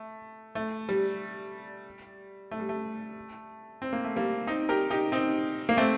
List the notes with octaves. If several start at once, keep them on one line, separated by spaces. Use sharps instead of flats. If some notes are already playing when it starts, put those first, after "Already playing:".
Already playing: A3
A3
G3
A3
G3
A3
C4
A#3
A3
G3 A#3
C4 D#4
G4 A#4
D#4 G4
C4 D#4
A#3
A3 C4